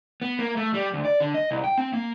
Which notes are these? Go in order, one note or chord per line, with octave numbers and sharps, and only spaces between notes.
B3
A#3
A3
G3
D2
D5
D3
D#5
C2
G5
C4
A#3